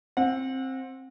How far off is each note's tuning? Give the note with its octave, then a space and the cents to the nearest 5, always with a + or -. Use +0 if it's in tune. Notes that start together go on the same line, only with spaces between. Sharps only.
C4 +15 F#5 -30